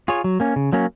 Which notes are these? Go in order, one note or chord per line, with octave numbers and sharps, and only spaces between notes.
F4 G#4 C#5
F#3
A#3 C#4
C#3
F#3 A#3 C#4